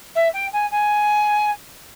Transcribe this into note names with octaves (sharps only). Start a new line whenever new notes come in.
E5
G5
G#5
G#5